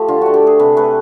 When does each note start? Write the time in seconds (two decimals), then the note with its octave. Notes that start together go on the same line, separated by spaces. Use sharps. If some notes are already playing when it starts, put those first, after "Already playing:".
Already playing: F3 A3 G4
0.08 D3 F4
0.22 A3 F#4
0.34 G4
0.43 A3 G#4
0.59 C3 B4
0.77 A3 B4